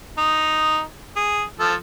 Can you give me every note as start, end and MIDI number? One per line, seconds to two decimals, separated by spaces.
0.18 0.81 63
1.16 1.43 68
1.60 1.74 53
1.60 1.74 69